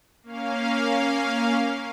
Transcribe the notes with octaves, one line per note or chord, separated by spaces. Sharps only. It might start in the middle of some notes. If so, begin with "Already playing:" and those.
A#3 C#4 F5